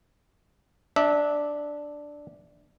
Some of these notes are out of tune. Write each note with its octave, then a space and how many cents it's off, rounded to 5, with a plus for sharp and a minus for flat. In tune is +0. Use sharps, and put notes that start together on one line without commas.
D4 +0 E5 -25